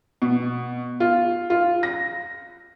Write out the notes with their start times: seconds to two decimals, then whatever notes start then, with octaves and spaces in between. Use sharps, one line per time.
0.22 B2
1.00 F4
1.50 F4
1.83 A#6